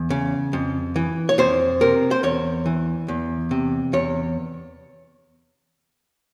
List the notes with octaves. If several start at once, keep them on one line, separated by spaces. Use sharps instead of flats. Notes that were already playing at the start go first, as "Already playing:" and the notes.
Already playing: E2
C#3
F2
E3
C#5
F2 C5
C3 A#4
C5
E2 C#5
E3
E2
C3
E2 C#5